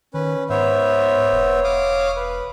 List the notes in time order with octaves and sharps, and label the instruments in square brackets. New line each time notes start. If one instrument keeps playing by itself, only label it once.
[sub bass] D#3 [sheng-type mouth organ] C#4 B4
[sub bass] G#2 [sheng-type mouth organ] B3 C5 E5 [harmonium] C#5
[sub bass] E1
[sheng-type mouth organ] F5 D6 D#6
B4